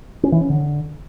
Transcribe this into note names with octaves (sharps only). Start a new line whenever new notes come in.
C#4
E3
C#4
D3